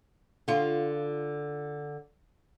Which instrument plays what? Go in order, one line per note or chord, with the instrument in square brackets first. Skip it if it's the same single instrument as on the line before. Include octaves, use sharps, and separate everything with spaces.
[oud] D3 F4